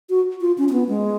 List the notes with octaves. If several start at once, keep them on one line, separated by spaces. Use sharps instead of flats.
F#4
F4
C#4
C#4
B3
G#3